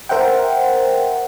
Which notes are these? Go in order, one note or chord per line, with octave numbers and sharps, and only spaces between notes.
A#4 C5 E5 F#5 G5